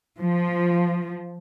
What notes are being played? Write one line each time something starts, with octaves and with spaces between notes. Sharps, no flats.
F3